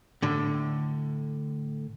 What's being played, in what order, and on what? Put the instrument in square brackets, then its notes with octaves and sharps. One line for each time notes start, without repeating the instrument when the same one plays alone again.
[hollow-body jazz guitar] A2 D3